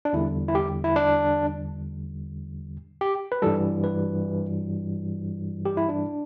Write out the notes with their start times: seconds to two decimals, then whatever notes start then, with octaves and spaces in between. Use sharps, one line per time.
0.05 D4
0.13 E2 D3 G3 E4
0.48 E4
0.55 G4
0.84 E4
0.96 D4
3.01 G4
3.32 B4
3.42 G2 E3 G3 A4
3.84 B4
5.65 G4
5.77 E4
5.89 D4